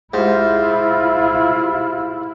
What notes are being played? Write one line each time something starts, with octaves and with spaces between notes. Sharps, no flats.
G#2 E4 F4 G4 E5